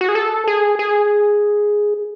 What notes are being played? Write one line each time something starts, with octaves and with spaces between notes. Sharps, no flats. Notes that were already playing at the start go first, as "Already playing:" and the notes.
F#4
G#4
A4
G#4
G#4